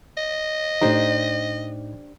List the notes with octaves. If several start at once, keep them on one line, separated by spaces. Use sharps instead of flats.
D#5
A2 D4 D#4 G4 C5